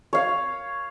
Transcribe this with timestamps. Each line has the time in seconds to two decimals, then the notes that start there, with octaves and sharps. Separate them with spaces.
0.13 C#5 F5